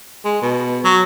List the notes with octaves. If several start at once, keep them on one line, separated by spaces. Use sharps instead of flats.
G#3
B2
F#3